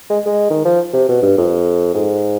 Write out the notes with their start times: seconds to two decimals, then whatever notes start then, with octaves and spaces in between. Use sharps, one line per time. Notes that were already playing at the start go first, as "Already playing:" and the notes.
0.10 G#3
0.26 G#3
0.50 D#3
0.65 F3
0.93 C3
1.09 B2
1.22 G2
1.38 F2
1.95 G#2